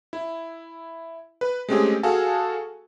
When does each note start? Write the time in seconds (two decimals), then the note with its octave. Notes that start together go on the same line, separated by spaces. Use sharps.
0.13 E4
1.41 B4
1.68 G#3 A3 C4 C#4 G4 G#4
2.03 F#4 G#4 A4 F5 G#5 A5